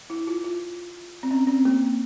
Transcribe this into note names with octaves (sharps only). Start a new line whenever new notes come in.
E4
F4
F4
C4
C#4
C4
A#3